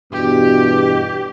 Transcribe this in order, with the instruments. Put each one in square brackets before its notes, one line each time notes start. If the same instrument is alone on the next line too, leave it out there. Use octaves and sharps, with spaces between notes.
[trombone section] E2 G2 B2 [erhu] G4